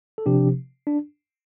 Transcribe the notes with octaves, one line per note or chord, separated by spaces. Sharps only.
A4
C3 F3 D4 G4
D4